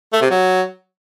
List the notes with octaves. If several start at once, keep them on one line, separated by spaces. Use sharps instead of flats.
A3
C3
F#3